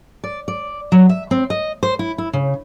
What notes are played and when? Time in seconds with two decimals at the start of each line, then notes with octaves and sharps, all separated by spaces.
0.24 D5
0.48 D5
0.92 F#3
1.09 E5
1.31 C4
1.50 D#5
1.83 C5
1.99 E4
2.18 E4
2.33 C#3